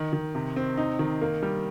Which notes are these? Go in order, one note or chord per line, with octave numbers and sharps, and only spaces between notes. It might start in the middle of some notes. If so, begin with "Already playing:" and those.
Already playing: D#3
D#3
C3
C4
D#4
D#3
A#3
G3